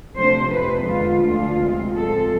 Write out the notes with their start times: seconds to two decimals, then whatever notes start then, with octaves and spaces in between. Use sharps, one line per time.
0.15 C3 F3 A3 D4 C5
0.52 F2 C3 F3 A3 D4 B4
0.87 E2 D3 F3 G#3 D4 F4
1.23 D2 D3 A3 D4 F4
1.59 D2 C3 G#3 C4
1.95 A2 F3 G#3 C4 A4